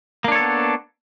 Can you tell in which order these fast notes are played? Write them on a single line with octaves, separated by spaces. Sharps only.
A#3 D4 C#5 A4 B3